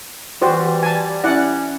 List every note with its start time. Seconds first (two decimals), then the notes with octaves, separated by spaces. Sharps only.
0.42 E3 G3 F#4 G4 C5
0.83 G#5 A5
1.24 C#4 E4 D5 F#5